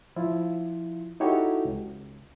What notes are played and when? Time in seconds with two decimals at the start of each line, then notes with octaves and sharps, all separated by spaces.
0.16 F3 E4 F4
1.20 D#4 E4 F#4 G4 A4 C#5
1.65 C#2